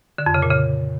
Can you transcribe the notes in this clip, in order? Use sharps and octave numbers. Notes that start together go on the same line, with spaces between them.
D3
F2
C#3
A#2
C#3